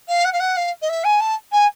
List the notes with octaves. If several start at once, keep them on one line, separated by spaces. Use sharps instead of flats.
F5
F#5
F5
F#5
F5
D#5
E5
G#5
A5
G#5